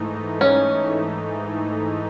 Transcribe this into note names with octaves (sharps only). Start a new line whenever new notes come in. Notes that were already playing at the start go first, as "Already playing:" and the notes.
Already playing: G#2 E3 A3 D#4
C#4